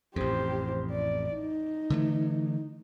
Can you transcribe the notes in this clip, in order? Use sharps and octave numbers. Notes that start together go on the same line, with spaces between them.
A1 F2 G4 C5
D5
D#4
D3 E3 A3